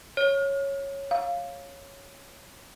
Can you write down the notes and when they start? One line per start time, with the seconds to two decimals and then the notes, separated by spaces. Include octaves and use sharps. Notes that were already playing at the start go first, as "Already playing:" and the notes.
0.17 C#5
1.11 F5